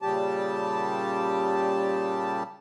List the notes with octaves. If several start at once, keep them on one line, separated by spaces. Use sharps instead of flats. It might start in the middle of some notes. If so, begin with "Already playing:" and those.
A#2 C#3 G3 G4 A5